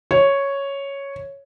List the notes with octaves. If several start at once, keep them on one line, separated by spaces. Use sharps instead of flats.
C#5